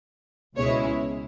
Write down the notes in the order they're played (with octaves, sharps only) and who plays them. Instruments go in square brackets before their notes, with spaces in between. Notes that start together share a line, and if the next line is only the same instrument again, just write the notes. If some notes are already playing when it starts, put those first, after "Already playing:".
[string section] C#2 B2 G#3 C#4 E4 C#5